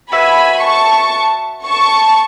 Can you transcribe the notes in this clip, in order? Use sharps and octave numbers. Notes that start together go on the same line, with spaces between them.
F#4 B4 E5 G#5 B5
A5 C#6
A5 C#6